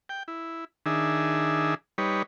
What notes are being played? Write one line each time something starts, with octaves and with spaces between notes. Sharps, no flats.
G5
E4
D#3 D4 G#4 E5
G3 D#4 B4 C#5